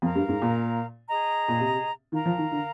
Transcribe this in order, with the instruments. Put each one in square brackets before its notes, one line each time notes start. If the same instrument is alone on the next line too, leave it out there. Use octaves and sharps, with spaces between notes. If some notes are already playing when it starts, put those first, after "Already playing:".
[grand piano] F2 [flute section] A#4 F5 A#5
[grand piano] G2
G#2
A#2
[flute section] G#4 D#5 A#5
[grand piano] A#2
C3
[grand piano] D#3 [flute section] A#4 F5 A#5
[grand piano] F3
D#3
D3